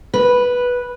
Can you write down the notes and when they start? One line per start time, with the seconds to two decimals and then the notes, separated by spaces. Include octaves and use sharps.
0.14 B4